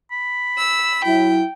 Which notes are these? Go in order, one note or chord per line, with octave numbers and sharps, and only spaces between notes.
B5
E6
F#3 E4 G5